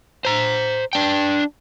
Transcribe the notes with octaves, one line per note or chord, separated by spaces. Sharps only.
C5 A#5
D4 G5